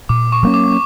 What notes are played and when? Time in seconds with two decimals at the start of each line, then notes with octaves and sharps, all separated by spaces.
0.09 A#2 D6
0.32 C#6
0.43 F#3 A#3 C#4
0.54 D6